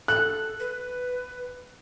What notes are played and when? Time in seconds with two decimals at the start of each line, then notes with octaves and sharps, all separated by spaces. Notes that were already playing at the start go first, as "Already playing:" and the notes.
0.08 A4 F#6
0.59 B4